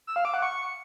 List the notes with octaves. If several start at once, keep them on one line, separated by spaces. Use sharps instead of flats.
E6
F5
D6
F#5
C#6